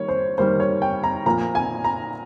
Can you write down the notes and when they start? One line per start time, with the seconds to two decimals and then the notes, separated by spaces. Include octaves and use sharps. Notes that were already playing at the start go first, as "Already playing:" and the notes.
Already playing: D#3 G3 A#3 C#5
0.08 C5
0.38 D#3 G3 A#3 C5
0.60 C#5
0.82 G5
1.04 A#5
1.26 A#2 F3 A#3 A#5
1.55 G#5
1.84 A#5